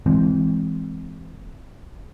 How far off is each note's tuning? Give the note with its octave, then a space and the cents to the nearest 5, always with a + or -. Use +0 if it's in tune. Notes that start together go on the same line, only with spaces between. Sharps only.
E3 +0 G#3 +0 C4 +0